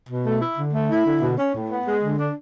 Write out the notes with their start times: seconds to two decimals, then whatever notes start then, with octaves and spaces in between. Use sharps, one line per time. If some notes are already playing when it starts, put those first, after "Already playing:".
0.09 B2
0.25 A3
0.41 E4
0.57 D3
0.74 A3
0.90 E4
1.06 D3
1.22 B2
1.38 C#4
1.54 A2
1.70 B3
1.86 G#3
2.03 D3
2.19 D4